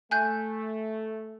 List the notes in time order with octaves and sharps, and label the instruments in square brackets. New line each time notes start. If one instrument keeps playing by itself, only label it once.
[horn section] A3 [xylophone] G#5 F#6 G6